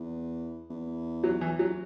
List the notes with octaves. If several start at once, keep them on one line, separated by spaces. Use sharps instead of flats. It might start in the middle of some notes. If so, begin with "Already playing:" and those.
Already playing: E2
E2
F#3
E3
F#3